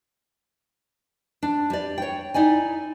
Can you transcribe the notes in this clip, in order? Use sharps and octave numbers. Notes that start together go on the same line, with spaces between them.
D4
G3 D5
C#5 G5
D#4 E4 D5 G#5